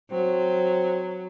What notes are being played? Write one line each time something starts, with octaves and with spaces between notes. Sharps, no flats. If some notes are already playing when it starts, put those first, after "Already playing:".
F#3 C4